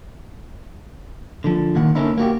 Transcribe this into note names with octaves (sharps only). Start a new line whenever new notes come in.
D3 F3
A#2 D#3 F#5
D3 A#3 C#4 D#4 E4
A#3 F#4 G4